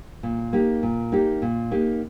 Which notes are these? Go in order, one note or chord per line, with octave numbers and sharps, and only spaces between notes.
A#2
A#3 D#4 G4
A#2
A#3 D#4 G4
A#2
A#3 D#4 G4